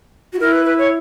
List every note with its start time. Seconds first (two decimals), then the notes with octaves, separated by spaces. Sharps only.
0.33 F#4
0.40 E4 A#4
0.52 B4
0.65 B4
0.78 C#5